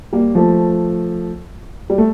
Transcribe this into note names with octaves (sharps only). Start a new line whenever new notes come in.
G3 A#3
F3 A3
G3
A3